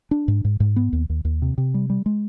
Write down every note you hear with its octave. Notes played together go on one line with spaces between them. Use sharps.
D4
G#2
G#2
G#2
B3
D#2
D#2
D#2
C3
C3
G3
G3
G#3